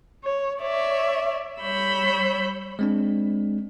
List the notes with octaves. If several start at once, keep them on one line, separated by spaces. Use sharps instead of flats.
C#5
C#5 D5 E5
G3 C#5 B5 E6 G6
G#3 C4 D4